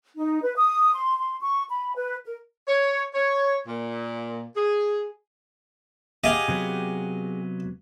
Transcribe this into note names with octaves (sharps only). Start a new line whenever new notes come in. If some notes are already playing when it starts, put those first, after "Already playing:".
D#4
B4
D#6
C6
C6
C#6
B5
B4
A#4
C#5
C#5
A#2
G#4
G4 G#4 D#5 F5 F#5
C3 F#3 B3